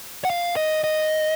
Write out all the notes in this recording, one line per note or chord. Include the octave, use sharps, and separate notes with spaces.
F#5
F5
D#5
D#5